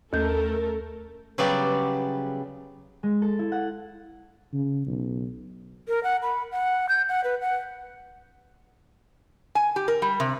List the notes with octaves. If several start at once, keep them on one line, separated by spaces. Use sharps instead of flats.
D#2 A3 A4 A#4 G6
C#3 F#3 G3 B3 G4 D5
G#3
A4
E4
F#5
C#3
B1
A#4
F#5
B5
F#5
G6
F#5
B4
F#5
G#5
G4
A#4
G3
C3